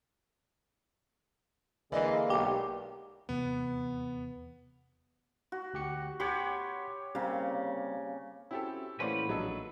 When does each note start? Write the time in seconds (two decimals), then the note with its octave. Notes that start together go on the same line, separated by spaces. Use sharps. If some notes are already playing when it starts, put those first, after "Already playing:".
1.92 D3 E3 G#3 A#3 D5 D#5 F5
2.30 B1 G4
3.29 D#1 E2 C3 B3
5.52 F#4
5.74 D2 G4 C#7
6.20 G4 C#5 F#5 B5 C6
7.15 C#3 G3 A#3 C4
8.51 C4 C#4 E4 F#4 G4 A4
9.00 A2 E3 A#3 C#4 B4 C5 D5 F#5
9.29 A#1 F#3 D#4 A4